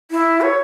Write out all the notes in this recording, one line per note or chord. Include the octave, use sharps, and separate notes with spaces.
E4
C#5